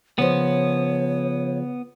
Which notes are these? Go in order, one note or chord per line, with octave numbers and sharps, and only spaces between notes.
C#3 F3 B3 C5 C#5